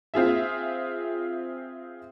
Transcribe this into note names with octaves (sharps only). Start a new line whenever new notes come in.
C4 F4 G#4 E5